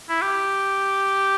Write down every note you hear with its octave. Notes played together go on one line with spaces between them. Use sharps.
E4
G4